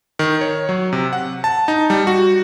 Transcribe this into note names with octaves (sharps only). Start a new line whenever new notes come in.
D#3
C#5
F#3
C3
F#5
A5
D#4
G3
F#4